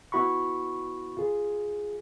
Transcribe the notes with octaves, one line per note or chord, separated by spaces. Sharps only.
B3 E4 F#4 B5 C#6
F4 G#4